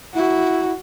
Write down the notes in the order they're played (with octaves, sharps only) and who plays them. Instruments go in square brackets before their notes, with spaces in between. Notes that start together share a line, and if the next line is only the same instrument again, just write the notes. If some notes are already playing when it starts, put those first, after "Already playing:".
[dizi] E4 [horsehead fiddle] F#4